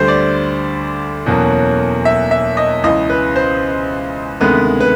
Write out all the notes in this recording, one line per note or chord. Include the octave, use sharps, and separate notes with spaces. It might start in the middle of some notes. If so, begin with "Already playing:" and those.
Already playing: D2 D3 G3 C5
D5
E2 B2 F#3 A#3 C#4
E5
E5
D#5
C#2 C#3 E3 D#5
B4
C5
D2 C3 D#3 G#3 B3 B4
B4